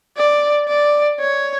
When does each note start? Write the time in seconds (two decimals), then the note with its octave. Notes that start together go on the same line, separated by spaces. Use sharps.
0.17 D5
0.68 D5
1.20 C#5